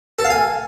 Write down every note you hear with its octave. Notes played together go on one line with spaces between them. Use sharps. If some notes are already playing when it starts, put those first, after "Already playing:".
A4
F5
G#5